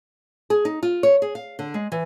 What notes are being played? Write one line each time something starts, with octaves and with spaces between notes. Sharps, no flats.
G#4
D#4
F4
C#5
G#4
F5
D3
G#3
E3